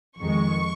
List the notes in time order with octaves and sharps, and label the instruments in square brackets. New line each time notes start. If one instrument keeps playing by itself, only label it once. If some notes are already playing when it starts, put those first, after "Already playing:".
[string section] F2 D#3 G#3 C#6